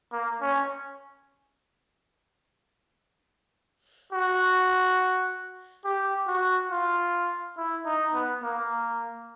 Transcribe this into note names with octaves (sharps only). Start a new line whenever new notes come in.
A#3
C#4
F#4
G4
F#4
F4
E4
D#4
B3
A#3